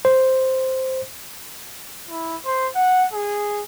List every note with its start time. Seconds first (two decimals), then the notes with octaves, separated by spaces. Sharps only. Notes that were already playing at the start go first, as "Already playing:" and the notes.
0.05 C5
2.09 E4
2.45 C5
2.75 F#5
3.13 G#4